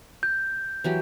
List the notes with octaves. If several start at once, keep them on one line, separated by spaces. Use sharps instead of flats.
G6
E3 F#3 G4